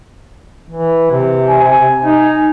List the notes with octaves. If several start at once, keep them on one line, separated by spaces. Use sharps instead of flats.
E3
C3
G#5
D#4